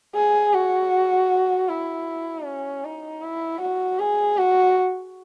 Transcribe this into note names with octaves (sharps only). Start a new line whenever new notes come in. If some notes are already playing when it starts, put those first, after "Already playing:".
G#4
F#4
E4
C#4
D#4
E4
F#4
G#4
F#4